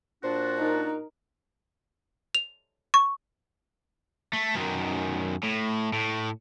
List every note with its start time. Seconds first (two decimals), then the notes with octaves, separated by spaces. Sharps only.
0.24 A#2 D4 F#4 C5
0.58 D#4 A#4
2.35 F7
2.94 C#6
4.33 A3
4.55 F#2 D#3
5.44 A2
5.93 A2